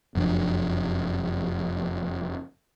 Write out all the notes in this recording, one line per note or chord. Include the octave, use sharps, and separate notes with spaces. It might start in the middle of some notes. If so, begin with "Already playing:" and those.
F1 F#2 F3 D4